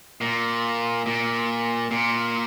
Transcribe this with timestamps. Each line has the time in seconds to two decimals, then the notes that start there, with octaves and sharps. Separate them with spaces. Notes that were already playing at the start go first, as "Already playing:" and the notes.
0.21 A#2
1.06 A#2
1.91 A#2